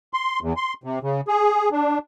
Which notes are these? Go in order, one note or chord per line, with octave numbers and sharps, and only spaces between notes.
C6
E2
C6
C3
C#3
G#4
D4